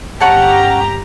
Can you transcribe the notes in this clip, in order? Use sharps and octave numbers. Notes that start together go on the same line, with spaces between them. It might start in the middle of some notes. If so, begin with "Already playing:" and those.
G1 C#4 G4 F#5 A5 A#5